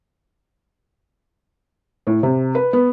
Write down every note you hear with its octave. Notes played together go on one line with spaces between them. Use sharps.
A2
C3
B4
B3